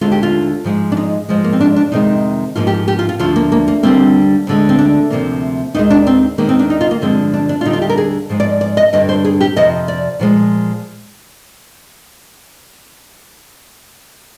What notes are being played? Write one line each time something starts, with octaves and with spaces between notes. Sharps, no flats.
D#2 D3 G#3 F4
G4
F4
G#2 F3 G#3
D4
D#4
G#2 F3 G#3
A#3
C4
D4
D4
F2 C3 D#3 G#3 D#4
G#2 F3 A#3 F4
G4
G4
F4
F4
D2 D3 F3 F4
A#3
A#3
A#3
D#2 D3 G3 A#3 C4
D2 D3 G#3
C4
D4
D2 C3 F3 A#3
D#2 D#3 G#3 D#4
D4
C4
D#2 D#3 G#3 A#3
C4
D4
D#4
F4
A#3
G2 D3 F3 G#3 C4
D4
D4
F4
D#2 D3 G3 D#4
F4
G4
A#4
G#4
G#2 F3 G#3
D5
D5
D#5
G2 D3 G3 D#5
C5
G#4
G4
F2 C3 F3 D#5
D5
A#2 F3 G#3